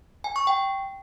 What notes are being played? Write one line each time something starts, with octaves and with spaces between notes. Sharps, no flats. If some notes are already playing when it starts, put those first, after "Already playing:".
G#5
C#6
G5